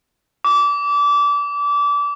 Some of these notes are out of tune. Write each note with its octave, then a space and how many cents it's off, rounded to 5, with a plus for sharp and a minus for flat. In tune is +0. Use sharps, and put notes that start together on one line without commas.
D6 -25